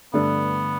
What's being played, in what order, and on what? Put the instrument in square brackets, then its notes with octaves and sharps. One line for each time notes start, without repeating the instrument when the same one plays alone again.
[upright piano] G2 D3 A3 D4 [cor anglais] B3